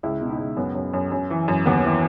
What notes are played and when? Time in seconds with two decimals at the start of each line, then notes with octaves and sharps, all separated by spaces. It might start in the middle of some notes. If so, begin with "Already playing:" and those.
0.03 C#2 E4
0.21 B2
0.30 D#4
0.39 C#2
0.57 F#2 B3
0.75 F#2
0.94 F#2
1.12 F#2
1.30 E3
1.48 F#2
1.66 D#2 B3
1.85 E3